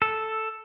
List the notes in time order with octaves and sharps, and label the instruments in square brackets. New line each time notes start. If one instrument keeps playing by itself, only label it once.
[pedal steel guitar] A4